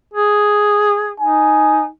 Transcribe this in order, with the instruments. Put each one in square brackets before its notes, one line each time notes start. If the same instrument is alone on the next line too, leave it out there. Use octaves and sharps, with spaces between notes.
[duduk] G#4
[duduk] D#4 [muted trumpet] G#5